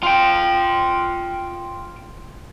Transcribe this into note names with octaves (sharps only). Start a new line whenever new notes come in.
F4 G5